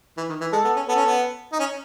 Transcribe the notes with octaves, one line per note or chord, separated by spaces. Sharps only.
E3
D#3
E3
G#3 A4
B3
C#4
B3 A4
C#4
B3
D#4
C#4